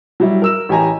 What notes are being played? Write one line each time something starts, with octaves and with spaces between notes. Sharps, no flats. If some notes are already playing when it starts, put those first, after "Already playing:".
F#3 G3 E4
A#4 E6 E7
A1 G4 D#5 G#5 A#5